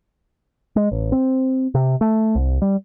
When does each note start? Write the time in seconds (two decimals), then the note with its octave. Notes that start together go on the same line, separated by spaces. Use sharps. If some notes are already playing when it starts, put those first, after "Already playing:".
0.76 G#3
0.92 A1
1.12 C4
1.75 C3
2.01 A3
2.35 C2
2.62 G3